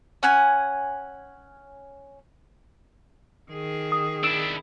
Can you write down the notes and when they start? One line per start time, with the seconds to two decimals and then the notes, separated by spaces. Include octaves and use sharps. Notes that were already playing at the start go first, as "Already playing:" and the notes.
0.23 C#4 F#5 G#5
3.52 D#3 G#4
3.92 D#6
4.24 D4 E4 E6 D7 E7